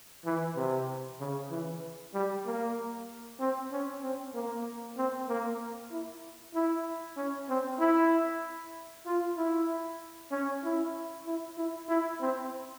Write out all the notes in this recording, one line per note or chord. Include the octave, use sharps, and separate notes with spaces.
E3
C3
C#3
E3
G3
A#3
C4
C#4
C4
A#3
C4
A#3
E4
E4
C#4
C4
E4
F4
E4
C#4
E4
E4
E4
E4
C4